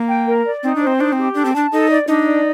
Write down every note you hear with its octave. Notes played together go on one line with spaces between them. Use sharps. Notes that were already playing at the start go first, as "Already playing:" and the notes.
Already playing: A#3
G5
A#4
D5
C4 D#4
D4
C5
C4
D4 D#4
C4
G4
D4 A4
C4
D4 A5
D#4 A4
D5
D4 D#4
D5